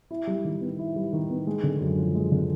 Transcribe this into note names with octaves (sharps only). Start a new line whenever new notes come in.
E4
G3
D#3
B3
E4
G3
D#3
B3
G#3
D3
F#2
F3
G#3
D3